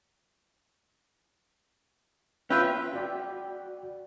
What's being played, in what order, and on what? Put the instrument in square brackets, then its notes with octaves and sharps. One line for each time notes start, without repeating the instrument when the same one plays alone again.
[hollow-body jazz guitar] C#4 F4 [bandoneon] B4 E5 G5
[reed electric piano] F#4 D5 G5